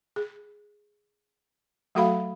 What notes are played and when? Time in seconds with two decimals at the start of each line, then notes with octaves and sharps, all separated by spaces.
0.16 G#4
1.95 F#3 A3 F#4 A4 F5 B5